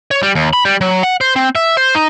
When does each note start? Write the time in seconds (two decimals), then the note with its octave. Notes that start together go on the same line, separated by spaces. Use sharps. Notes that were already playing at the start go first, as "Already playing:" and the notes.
0.11 C#5
0.23 G3
0.35 D#2
0.53 B5
0.65 G3
0.81 F#3
1.03 F#5
1.21 C5
1.36 C4
1.55 E5
1.77 C5
1.95 D#4